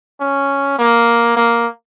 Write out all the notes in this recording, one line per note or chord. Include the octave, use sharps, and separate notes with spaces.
C#4
A#3
A#3